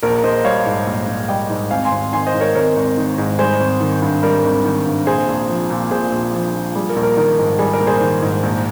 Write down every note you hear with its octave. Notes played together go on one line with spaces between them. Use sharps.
A#1 A#4
A#1 C5 D#5
G3 C#5 F5
G#2
A#1
A#1
G3 D#5 G5
G#2
G#1 F5 G#5
G#5 C6
G#1
D#3 G#5 C6
C5 D#5
G#2
A#4 C#5
G#1 A#4 C#5
G#1
D#3
G#2
G3 G#4 C5
G#1
D#3
G2
G3 A#4
G#1
D#3
G2
A#1 G#4 C5
A#1
F3
A#2
A#1 G#4 C5
A#1
F3
A#2
G3 G#4
A#4
A#1
A#4
D#3 A#4
G#2
G3 G#4
A#4
A#1
G#4 C5
D#3
G#2
A#1